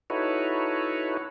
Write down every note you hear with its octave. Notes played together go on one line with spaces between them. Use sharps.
D#4 E4 F#4 A4 B4 C#5